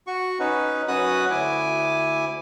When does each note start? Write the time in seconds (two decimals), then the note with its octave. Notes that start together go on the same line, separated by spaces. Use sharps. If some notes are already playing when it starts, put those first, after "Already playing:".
0.07 F#4 C#6
0.40 C#4 D#4 B4
0.88 F#2 C#4 F#4 B4 D#6 F#6
1.30 D2 E4 G#5 D6